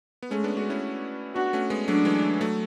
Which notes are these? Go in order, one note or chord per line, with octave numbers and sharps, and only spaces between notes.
B3
G#3 A3 C#4
B3 D4
D4 F#4
C#4 E4
B3 D4 F#4
A3 C#4
G#3 B3
F#3 A3 D4
E3 G#3
F#3 A3